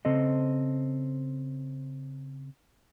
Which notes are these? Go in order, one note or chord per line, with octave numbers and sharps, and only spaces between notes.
C#3 C4 A4 C5 D#5